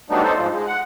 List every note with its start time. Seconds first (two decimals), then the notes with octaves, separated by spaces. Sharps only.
0.10 F#3 G3 A3 B3 D4 D#4
0.23 D#4 A4 C5
0.36 G#2 F3
0.51 G#3
0.66 F#5